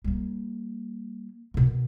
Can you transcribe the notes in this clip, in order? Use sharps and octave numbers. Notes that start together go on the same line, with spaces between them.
G3 A#3
B2 D#3